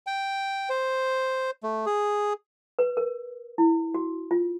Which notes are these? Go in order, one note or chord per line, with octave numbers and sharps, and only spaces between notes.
G5
C5
A3
G#4
B4
A#4
E4
F#4
F4